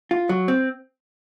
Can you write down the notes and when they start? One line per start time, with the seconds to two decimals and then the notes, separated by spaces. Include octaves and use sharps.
0.11 F4
0.29 F#3
0.48 C4